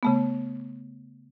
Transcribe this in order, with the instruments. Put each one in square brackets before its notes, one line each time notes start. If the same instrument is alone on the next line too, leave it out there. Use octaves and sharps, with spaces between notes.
[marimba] C#3 A3 B3